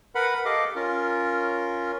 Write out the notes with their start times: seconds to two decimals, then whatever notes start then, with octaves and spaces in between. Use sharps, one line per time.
0.15 A#4 B4 F#5 B5
0.45 G4 A4 D#5 F5 D6
0.75 C#4 F4 A#4